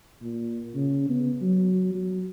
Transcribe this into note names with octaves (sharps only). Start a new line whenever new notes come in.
A#2
C#3
B3
F#3
F#3